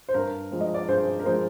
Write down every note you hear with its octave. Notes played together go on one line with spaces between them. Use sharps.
C5
G2 A#4
F3 G#3
D#5
D5
G2 G#4 C5
A#4
F3 G#3 G#4 C5